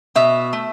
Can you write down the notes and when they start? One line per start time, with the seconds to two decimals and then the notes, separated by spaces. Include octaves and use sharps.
0.15 B2 E5
0.53 A3